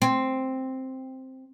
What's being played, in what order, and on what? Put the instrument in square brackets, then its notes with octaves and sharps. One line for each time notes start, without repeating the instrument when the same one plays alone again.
[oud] C4